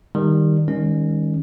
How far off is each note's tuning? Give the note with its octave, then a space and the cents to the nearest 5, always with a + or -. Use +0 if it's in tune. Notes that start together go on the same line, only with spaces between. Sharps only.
D#3 +0 G3 +15
D#3 +10 G#3 -45 C#4 +0